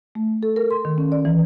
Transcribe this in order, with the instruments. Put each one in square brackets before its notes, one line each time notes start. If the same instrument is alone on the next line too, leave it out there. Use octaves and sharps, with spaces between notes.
[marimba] A3
A4
A#4
C6
D#3
C#4
D5
E3